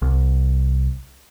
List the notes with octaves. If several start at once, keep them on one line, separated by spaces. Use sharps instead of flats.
C2